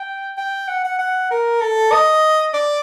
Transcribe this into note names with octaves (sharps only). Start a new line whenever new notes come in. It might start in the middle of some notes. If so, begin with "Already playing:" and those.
Already playing: G5
G5
F#5
F#5
F#5
A#4
A4
D#5
D5